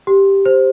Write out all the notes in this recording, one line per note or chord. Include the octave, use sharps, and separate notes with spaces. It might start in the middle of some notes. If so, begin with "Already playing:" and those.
G4
C5